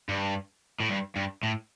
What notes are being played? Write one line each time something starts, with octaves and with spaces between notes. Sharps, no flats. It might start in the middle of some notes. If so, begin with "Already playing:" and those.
G2
A2
G2
G2
A2